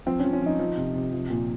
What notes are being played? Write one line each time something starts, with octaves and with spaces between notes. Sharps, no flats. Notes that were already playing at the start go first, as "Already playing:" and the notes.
F3 C4
C#4
F3
C#4
F3 D#4
F3
C3
C3
F3
A#2